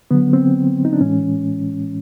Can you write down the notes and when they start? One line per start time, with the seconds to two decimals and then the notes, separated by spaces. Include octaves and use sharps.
0.11 D3 F#3 B3
0.33 C4
0.85 D#4
0.93 D4
1.00 A2 E3 G#3 C#4